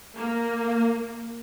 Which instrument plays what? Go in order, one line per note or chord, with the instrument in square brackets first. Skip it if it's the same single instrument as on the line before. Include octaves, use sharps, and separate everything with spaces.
[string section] A#3